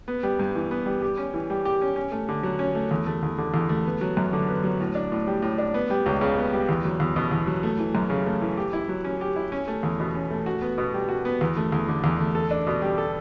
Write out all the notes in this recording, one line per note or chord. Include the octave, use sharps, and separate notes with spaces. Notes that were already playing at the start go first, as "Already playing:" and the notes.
B3
G3
G2
E3
B3
G3
G4
C#4
E3
G3
G4
C#4
C#4
A3
D3
F#3
C#4
A3
E2
A3
E2
D3
E2
A3
B3
F#3
F#2
D3
B3
F#3
A2
D4
A2
G3
A2
D4
B3
G3
C#2
C#3
B3
G3
E2
F#3
E2
B2
E2
F#3
A3
E3
F#2
C#3
A3
E3
G4
E4
F#3
C#4
G4
E4
C#4
A3
E2
B2
C#4
A3
F#4
B3
B2
G3
F#4
B3
E2
A3
E2
D3
E2
A3
A4
D4
B2
G3
A4